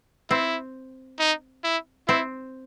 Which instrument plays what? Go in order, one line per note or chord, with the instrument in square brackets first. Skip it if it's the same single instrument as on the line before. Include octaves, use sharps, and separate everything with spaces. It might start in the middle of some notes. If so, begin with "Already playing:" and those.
[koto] C4 [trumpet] E4
[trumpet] D#4
E4
[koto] C4 [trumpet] E4